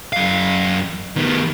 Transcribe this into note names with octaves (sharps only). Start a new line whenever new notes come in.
F#2 F5
D#3 B3